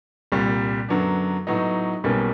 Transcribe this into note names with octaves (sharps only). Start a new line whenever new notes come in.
C2 A#2 G3
F#2 D3 F#3 B3 D4
A2 F#3 B3 D#4
B1 B2 G3 A#3 C#4